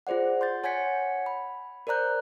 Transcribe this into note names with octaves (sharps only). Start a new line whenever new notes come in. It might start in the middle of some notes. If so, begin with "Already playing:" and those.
F4 G#4 C5 D5 F#5
C6 G6 A6
C#5 F#5 G#5 G#6 B6 C#7
B5
A#4 C5 D5 A#5 F#6 G6